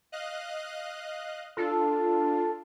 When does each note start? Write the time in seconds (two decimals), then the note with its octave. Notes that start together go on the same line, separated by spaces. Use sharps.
0.12 D#5 F5 F#6
1.57 D4 F4 A4